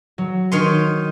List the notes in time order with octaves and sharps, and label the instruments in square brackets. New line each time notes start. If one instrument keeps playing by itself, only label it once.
[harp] F#3
[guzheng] D#3 C#5 C6 [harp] D#7